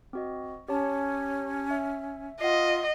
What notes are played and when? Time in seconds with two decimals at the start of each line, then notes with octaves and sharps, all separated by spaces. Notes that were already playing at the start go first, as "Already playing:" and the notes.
0.13 C4 F#4 D#5
0.68 C#4 G4 C#5 A5
1.71 E5
2.41 F4 D#5 F#5 C7